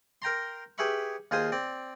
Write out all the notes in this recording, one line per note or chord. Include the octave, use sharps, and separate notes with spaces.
A#4 G5 A#5 C6
G4 G#4 B4 E5 B5 C#6
D#2 F4 G#4 C5 G#5 D#6
C4 D5